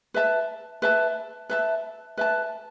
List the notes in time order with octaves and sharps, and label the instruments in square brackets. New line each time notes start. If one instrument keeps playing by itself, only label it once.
[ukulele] B4 E5 A5
B4 E5 A5
B4 E5 A5
B4 E5 A5